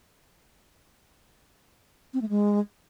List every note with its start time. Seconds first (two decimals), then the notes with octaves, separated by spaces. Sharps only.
2.14 C4
2.21 A3
2.29 G#3